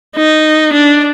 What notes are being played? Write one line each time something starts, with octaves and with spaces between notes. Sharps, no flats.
D#4
D4